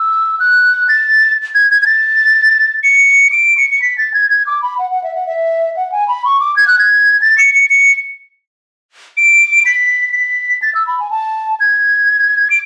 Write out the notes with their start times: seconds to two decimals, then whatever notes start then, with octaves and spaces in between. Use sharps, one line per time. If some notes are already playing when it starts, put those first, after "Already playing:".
Already playing: E6
0.40 F#6
0.89 A6
1.55 G#6
1.71 G#6
1.82 G#6
1.86 A6
2.83 C#7
3.32 D7
3.57 C#7
3.70 C#7
3.82 B6
3.98 A6
4.14 G#6
4.30 G#6
4.47 D6
4.62 B5
4.79 F#5
4.91 F#5
5.03 E5
5.15 F#5
5.27 E5
5.76 F#5
5.92 G#5
6.08 B5
6.25 C#6
6.40 D6
6.56 G#6
6.67 F#6
6.79 G#6
7.22 A6
7.38 C#7
7.55 C#7
7.70 C#7
9.17 D7
9.66 B6
10.13 B6
10.62 A6
10.75 E6
10.87 B5
11.00 G#5
11.11 A5
11.60 G#6
12.50 D7